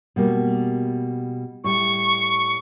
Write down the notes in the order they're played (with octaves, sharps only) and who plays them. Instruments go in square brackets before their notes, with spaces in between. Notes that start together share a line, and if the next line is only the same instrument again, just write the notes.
[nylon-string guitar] B2 G3 A#3
[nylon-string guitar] A2 G3 [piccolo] C#6